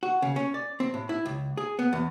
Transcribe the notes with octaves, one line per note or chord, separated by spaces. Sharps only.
F#4
C#3
C#4
D5
C4
A2
E4
C#2
G#4
B3
E2